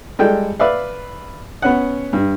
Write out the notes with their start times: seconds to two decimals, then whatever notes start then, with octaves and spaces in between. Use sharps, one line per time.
0.19 G3 G#3 A4 G5
0.60 B4 D5 E5 F5
1.62 B3 C#4 F#5
2.13 G2